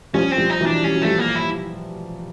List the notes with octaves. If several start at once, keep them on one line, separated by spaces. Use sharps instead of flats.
F3 G3 C#4
C4
F3 G3
D#4
E3 F#3
D4
G3 C#4
F#3
F3 G3 A3
A#3
E4